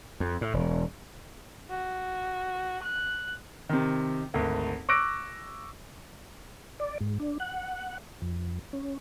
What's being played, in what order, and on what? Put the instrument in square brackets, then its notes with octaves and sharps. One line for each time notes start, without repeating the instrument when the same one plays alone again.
[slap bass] F2
A2
E1
[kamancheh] F#4
F#6
[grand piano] C3 D#3
G#1 D2
C#6 D6 E6 F#6 A#6 D7
[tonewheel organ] D5
G#2
D4
F#5
F2
C#4